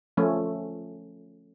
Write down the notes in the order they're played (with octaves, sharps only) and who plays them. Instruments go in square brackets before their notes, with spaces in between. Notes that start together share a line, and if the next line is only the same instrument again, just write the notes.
[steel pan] F3 A3 C#4 F4